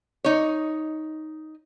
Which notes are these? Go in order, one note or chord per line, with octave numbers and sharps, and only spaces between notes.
D#4 C#5